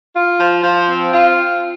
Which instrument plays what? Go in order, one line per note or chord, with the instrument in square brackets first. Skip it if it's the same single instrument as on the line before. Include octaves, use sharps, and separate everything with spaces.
[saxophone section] F4
F3
F3
C4
F4